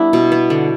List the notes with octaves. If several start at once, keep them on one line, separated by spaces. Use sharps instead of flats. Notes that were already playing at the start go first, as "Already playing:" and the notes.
Already playing: G3 B3 D4 E4
B2
B3
D3